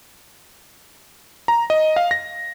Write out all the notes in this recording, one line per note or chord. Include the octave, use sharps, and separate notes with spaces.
A#5
D#5
F5
A#6